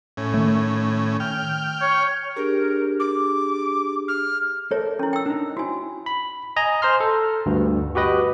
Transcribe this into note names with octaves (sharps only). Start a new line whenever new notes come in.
A2 C#4
D#3 A3
G5 F6
C#5
D4 G4 G#4 A#4
D6
F6
A4 A#4 C#5 E5
C#4 E4
G5 E6
D4 D#4
E4 F#4 G#5
B5
D#5 G#5 A#5
C5 A#5 C6 F6
A4
D2 G2
F#4 G4 B4 D#5